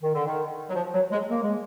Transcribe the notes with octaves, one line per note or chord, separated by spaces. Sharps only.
D#3
D3
D#3
F#3
F3
F#3
G#3
A#3
G#3